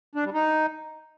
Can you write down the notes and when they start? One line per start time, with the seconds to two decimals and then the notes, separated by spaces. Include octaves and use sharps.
0.15 D4
0.24 G3
0.34 D#4